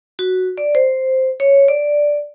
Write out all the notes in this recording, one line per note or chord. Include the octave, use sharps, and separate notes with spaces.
F#4
D5
C5
C#5
D5